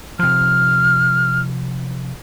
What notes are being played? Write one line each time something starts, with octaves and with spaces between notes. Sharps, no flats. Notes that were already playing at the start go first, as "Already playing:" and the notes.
C3 F3 F6